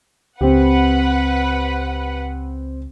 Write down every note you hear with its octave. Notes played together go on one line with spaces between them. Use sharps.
C#2 C4 G4 B4 F#5